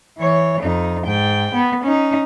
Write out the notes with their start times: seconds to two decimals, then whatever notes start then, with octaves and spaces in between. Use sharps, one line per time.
0.18 E3 C#5
0.61 F2 D#4
1.04 G#2 G5
1.54 B3
1.84 C#4 D#4